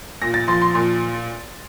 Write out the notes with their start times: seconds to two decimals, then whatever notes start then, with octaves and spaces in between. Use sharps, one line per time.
0.22 A#2 A#6
0.34 A6
0.48 F3 C6
0.62 C6
0.74 A#2 C6